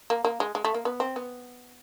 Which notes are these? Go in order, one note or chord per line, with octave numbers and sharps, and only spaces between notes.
A#3
A#3
G#3
G#3
A3
A#3
B3
C4
B3